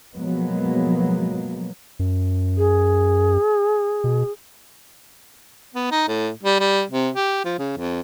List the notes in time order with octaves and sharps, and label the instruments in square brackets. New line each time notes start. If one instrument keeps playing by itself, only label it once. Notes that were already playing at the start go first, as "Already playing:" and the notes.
[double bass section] B2 F3 F#3 G#3 A#3 B3
[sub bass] F#2
[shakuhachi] G#4
[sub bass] B2
[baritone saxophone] B3
D#4
A2
G3
G3
C3
G4
F3
C#3
F2